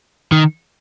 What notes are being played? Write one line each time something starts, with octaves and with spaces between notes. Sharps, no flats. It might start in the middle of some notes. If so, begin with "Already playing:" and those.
D#3